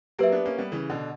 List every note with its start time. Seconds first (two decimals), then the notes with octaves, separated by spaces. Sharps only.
0.19 F#3 A#3 G4 B4 E5
0.32 B3 D4
0.45 A#3 C#4
0.58 G3 B3
0.72 C#3 E3
0.89 B2 D3